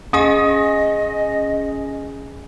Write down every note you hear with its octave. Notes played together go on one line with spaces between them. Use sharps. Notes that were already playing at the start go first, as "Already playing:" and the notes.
C#4 G#4 D#5 G#5 D#6